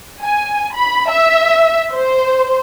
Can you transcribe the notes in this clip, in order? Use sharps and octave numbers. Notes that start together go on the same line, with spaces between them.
G#5
B5
E5
C5